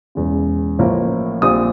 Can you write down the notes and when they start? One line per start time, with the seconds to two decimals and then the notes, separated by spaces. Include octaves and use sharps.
0.15 E1 E2 C#3
0.79 A1 A2 F3 A#3
1.42 A#1 A#2 G3 C4 D#6